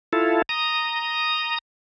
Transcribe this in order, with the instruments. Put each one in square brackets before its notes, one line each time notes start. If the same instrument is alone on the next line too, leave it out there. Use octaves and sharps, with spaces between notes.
[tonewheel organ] E4 F4 A4
A#5 D#6